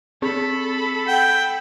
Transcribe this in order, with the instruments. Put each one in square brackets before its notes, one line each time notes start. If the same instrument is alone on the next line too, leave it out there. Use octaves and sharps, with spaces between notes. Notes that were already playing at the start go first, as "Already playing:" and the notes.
[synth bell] C4 G#4 [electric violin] A4 B5
[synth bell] F#5 [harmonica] G5